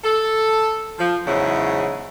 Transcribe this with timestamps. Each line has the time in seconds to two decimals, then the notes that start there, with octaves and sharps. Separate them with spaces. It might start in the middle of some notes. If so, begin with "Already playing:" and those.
0.04 A4
0.99 F3
1.26 E2 G#2 C#3 F#3 E4